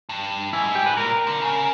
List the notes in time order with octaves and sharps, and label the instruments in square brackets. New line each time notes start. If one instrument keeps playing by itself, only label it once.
[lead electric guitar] G2
[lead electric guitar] G#2 [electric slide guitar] E4
[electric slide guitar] G4
B4
[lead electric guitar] A#2 [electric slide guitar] A#4
[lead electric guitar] D3
C#3